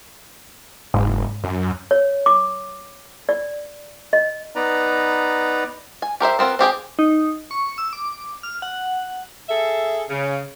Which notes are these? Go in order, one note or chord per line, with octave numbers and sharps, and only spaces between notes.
F#1 G#2
F#2
C#5
D6
D5
D#5
B3 D#4 B4 D5 A#5
G#5
G4 A#4 C5 E5
B3 C4 F4 A#4
C4 G4 G#4 G5
D#4
C#6
E6
D6
F6
F#5
G#4 A4 E5
C#3